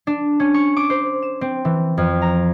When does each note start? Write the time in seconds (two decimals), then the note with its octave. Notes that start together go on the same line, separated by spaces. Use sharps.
0.07 D4
0.40 C#4
0.54 C#6
0.76 D6
0.90 C5
1.22 E7
1.41 C4
1.65 E3
1.98 F2
2.22 A#5